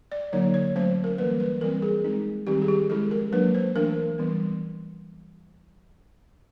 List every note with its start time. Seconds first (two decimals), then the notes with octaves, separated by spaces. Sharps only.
0.12 D5
0.32 D3 F#3 A#3 D#4 C#5
0.54 C#5
0.76 F#3 A3 C#4 C5
1.04 A#4
1.18 E3 G3 A#3 B4
1.40 B4
1.61 E3 G3 C4 A#4
1.82 G#4
2.04 G#3 C4 D#4
2.47 D#3 G3 C4 D#4 G4
2.62 G#4
2.68 G4
2.90 F3 G#3 C#4 E4 A4
3.11 A#4
3.32 F#3 A#3 D4 B4
3.54 C5
3.75 E3 A3 D4 A#4
4.18 E3 G3 B3